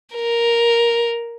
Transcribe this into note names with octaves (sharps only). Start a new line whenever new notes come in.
A#4